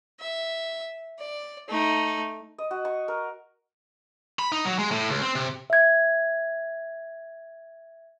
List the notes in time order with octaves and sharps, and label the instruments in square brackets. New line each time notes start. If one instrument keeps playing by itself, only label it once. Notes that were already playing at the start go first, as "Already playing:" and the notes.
[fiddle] E5
D5
A3 D#4
[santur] D#5
F#4
C#6
A#4
[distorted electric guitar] B5
D#4
F#3
G#3
A2
C#2
C4
C3
[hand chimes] E5 G#6